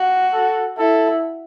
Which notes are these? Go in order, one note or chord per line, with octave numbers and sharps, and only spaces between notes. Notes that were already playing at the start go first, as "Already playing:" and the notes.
Already playing: F#4
A4
E4 A4